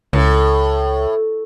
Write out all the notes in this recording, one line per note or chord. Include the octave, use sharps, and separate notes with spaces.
C#2 A2